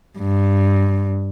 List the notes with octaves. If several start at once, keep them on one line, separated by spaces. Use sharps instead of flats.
G2